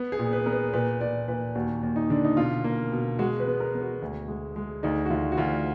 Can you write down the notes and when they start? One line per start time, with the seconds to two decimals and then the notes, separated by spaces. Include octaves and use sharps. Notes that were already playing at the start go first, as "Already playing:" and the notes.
Already playing: B3
0.12 G#4
0.19 A#2
0.33 B4
0.46 B3 A#4
0.52 B4
0.73 A#2 B4
1.01 A#2 D5
1.28 A#2 B4
1.55 D#2 F#4
1.83 D#2
1.96 D#4
2.10 D3 D4
2.24 D#4
2.37 B2 F4
2.64 A#3
2.92 B2
3.19 G#3 F#4
3.40 B4
3.47 B3
3.60 A#4
3.74 B3
3.81 F#4
4.02 D2
4.28 G#3
4.56 G#3
4.83 D2 D#4
5.06 F#4
5.10 D2 F4
5.32 F#4
5.37 D2 F4